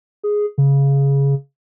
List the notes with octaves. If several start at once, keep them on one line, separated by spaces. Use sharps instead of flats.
G#4
C#3